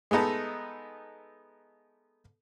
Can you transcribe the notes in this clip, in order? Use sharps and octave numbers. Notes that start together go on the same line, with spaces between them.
G#3 A3 B3 D#4 A4